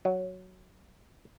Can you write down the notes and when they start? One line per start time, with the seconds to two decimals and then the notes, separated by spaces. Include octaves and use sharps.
0.05 F#3